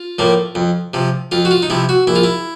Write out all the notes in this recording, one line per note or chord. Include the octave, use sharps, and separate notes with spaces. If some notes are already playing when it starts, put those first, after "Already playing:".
Already playing: F4
A2 F3 A#3
F2
C3 F3
F2 F4
F#4
F4
D#4
C3 F3 E4
F#4
A#1 E4
F4
E4